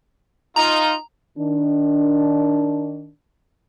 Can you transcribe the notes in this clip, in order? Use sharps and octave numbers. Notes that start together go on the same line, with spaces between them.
D#4 F4 A#5
D#3 D4